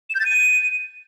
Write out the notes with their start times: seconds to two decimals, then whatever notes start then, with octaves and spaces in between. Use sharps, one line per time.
0.10 E7
0.15 G6
0.20 A6
0.25 D#7